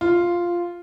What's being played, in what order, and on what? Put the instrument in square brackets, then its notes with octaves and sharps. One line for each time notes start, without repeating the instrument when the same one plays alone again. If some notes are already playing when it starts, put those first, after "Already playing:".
[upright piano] F4